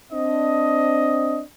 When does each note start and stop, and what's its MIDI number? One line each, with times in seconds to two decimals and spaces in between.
0.13 1.42 60
0.13 1.42 62
0.13 1.42 75